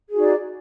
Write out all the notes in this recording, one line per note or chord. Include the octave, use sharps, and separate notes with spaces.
D#4 F#4 G#4 D5